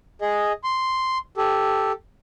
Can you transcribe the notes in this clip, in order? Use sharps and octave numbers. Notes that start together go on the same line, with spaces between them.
G#4 D#5
C6
G4 A4